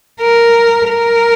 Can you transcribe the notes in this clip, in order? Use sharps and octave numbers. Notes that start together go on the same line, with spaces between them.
A#4
A#4